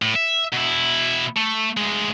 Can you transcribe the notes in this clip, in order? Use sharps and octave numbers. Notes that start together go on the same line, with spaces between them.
A2
E5
B2 E4
A3
D2 G#3